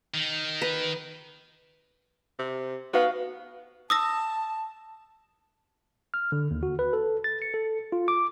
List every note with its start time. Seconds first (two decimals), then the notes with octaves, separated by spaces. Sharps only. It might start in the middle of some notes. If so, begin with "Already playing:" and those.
0.14 D#3
0.62 B4
2.39 C3
2.93 B3 D#4 F#4 B4 F5
3.90 A5 D#6 E6 A#6
6.14 F6
6.32 D3
6.51 D#2
6.63 F#4
6.79 B4
6.93 A4
7.24 A6
7.42 C#7
7.54 A4
7.92 F4
8.08 D6